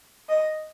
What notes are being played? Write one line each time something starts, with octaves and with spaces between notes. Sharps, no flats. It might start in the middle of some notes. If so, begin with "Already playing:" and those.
D#5